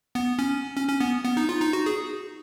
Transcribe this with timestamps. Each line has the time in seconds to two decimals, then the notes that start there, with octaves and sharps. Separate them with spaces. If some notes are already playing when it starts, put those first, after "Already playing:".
0.15 B3
0.39 C#4
0.76 C#4
0.88 C#4
1.01 B3
1.25 B3
1.37 D#4
1.49 F4
1.61 D#4
1.73 F#4
1.86 G#4